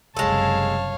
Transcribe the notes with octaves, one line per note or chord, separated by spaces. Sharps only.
F#1 C2 G#3 A4 C#5 F5 A5